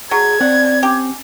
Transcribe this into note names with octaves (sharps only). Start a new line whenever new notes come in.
F#3 G#4 G#6
C4 D5 F#5
C#4 G4